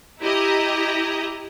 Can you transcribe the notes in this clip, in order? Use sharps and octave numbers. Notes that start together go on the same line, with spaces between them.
E4 G4 D#5 A#5